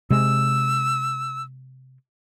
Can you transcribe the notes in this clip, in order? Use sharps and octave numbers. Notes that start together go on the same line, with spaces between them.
C3 G#3 E6